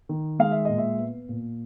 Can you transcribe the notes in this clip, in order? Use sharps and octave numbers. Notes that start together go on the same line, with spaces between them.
D#3
G#3 F5
E5
A#2 D#5
E5
B3
A#2